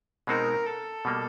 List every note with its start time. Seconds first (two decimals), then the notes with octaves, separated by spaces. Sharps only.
0.27 B2 G#3 C4 D#4 F#4 A#4
0.66 A4
1.05 B2 G3 A#3